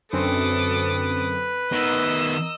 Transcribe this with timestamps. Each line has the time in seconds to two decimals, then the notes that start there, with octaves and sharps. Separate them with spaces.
0.13 F#2 D3 C4 A4 B4 D6 D#6
1.72 D#3 B3 A#4 D#5 E6